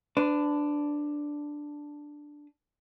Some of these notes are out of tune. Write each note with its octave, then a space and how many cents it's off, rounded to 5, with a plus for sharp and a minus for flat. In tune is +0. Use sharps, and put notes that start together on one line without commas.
D4 +0 B4 +40